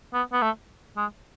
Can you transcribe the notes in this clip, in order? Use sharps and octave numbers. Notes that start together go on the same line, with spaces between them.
B3
B3
A3
G#3